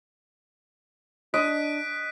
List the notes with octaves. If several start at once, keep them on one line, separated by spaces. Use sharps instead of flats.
D4 D#5 F#6 B6 D7